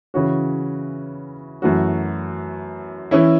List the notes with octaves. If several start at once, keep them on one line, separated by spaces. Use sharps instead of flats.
C#3 E3 C#4 F#4
F#2 E3 A3 F#4
E3 C#4 E4